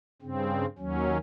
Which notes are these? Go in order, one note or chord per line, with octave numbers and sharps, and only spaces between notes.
G2 C#3 C4
D#2 F#3 C#4